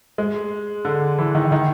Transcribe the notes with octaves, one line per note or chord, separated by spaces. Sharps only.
G#3
D3
E3
D#3
D#3